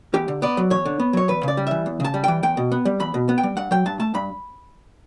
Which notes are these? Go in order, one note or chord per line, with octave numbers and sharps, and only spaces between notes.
E2 G4
D3
B3 D5
F#3
E2 C#5
D3
B3
F#3 C#5
E2 B4
C#3 D5
G3
E3 E5
E2
C#3 A5
G3
E3 G5
E2 G5
B2
B3
G3
E2 B5
B2
B3
G5
G3
G2 F#5
F#3 G5
G2 A5
A3 A5
G2 B5